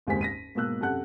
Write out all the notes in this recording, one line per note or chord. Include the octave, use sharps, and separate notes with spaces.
F#1 D#2 G#2 C4 G#5 B6
A#6 B6 D#7
G#2 B2 A#3 E6 F#6
F#2 C3 A4 F#5 F#6